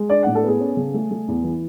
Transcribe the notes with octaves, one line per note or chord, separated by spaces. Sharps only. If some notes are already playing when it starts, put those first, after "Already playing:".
Already playing: G#3
D4 D5
A2 F#5
A4
B3 G#4
C#4
C#3
A3
A3
E2
E3